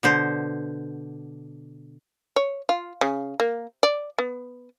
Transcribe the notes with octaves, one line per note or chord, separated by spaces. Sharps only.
B2 D3 C5
C#5
F4
C#3
A#3
D5
B3